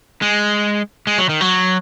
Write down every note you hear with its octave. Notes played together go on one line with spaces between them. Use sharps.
G#3
G#3
F#3
D#3
F#3